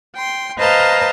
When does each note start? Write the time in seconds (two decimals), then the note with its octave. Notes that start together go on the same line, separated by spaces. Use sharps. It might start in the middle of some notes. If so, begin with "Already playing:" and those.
0.17 G5 C6
0.58 B4 C5 D#5 F5 A5 A#5